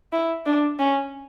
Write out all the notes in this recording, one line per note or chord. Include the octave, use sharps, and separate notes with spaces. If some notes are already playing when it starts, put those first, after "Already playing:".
E4
D4
C#4